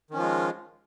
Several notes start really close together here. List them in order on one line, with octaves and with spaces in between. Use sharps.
D#3 C#4 F3 F4 G#3